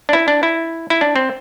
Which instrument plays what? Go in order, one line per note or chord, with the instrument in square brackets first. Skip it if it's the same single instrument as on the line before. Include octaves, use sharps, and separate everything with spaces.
[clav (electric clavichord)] D4
E4
D4
E4
E4
D4
C4